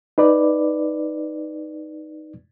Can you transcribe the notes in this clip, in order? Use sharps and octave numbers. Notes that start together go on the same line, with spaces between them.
D#4 B4 D5